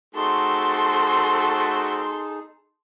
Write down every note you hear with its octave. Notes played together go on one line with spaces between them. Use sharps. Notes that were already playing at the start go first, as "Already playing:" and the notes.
A3 C4 D#4 F#4 G#4 A4 C6